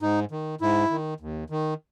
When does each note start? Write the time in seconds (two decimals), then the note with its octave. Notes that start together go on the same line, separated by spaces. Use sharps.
0.01 G#2 D#4
0.31 D#3
0.61 G#2 E4
0.90 D#3
1.20 D#2
1.50 D#3